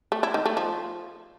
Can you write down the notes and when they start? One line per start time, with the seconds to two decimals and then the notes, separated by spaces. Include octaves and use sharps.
0.12 A3
0.23 E4
0.34 D#3
0.46 A3
0.57 F3